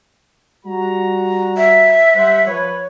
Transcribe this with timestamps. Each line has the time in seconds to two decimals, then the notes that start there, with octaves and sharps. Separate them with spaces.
0.66 G3 F#4 A#5
1.57 E5
2.15 G3 C5 F#5
2.46 F3 B4 C#5